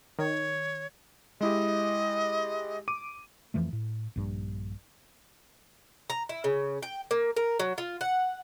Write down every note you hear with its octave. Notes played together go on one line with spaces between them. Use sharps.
D#3 C#5
G#3 E4 G4 D#5
D6 D#7
F2 E3 F3 A3
A2
A#1 G2
A#5
E4
C#3
G5
A#3
A#4
F#3
F4
F#5